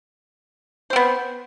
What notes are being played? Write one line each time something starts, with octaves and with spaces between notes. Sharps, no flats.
B3 C4 C5